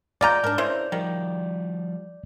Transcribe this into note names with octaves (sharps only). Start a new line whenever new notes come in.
G#3 F4 D5 A#5 D6 G6
G#2 D4 A#4
C#3 E4 A#4 C5
D#3 F3 G3